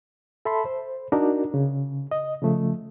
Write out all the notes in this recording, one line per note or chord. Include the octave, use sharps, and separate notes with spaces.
A4 E5 A5 B5 C6
C5
D4 D#4 F#4 A#4
C#3
D#5
C#3 F3 A3